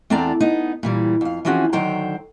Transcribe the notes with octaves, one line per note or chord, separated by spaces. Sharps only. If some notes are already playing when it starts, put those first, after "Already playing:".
E2 C4 D4 A4 D5 A#5
B3 D#4
A#2 E3 G3
F2 F5
E3 F3 C4 C#4 F#4 G#4
D3 D#3 F#3 C5 G5 A#5